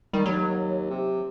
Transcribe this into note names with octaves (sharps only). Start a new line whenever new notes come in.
D#3 G3
D#2 F#3
C3